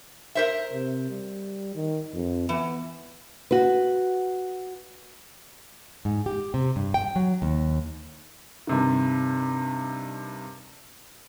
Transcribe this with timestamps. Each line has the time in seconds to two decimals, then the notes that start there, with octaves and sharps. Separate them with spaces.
0.35 A#4 C5 E5
0.72 C3
1.10 G3
1.75 D#3
2.14 F2
2.49 E3 B3
3.51 F#4 B4
6.05 G#2
6.26 G4
6.54 C3
6.76 G2
6.94 G5
7.16 F#3
7.42 D#2
8.67 G2 C3 D#3